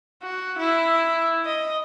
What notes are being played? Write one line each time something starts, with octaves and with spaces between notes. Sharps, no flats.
F#4
E4
D#5